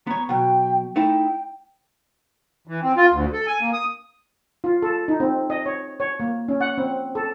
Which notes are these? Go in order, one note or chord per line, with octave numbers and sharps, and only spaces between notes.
B3 C#5 A#5
B2 F#3 G5
A3 D#4 E4 G5
E3
C4
F4
D2
A4
G#5
A#3
D#6
F4
A4
D#4
C4
D#5
C#5
C#5
A#3
C#4
F#5
C4
A4